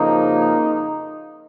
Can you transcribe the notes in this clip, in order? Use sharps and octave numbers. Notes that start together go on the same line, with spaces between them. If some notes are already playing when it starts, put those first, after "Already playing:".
Already playing: F2 C#3 F3 A#3 D#4